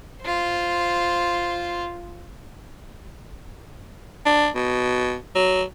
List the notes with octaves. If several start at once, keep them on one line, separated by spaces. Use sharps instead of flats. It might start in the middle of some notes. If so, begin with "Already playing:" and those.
F4 C5
D4
B2
F#3